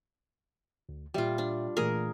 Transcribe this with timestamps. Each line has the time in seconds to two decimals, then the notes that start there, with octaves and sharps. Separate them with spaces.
0.89 D2
1.14 A#2 G3 F4 E5 G5
1.38 D4
1.77 A#2 E3 A3 G#4 A#4